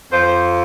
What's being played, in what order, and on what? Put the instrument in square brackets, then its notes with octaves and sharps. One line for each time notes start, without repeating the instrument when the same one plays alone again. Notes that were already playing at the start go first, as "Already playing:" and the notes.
[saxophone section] F2 F3 [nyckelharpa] C5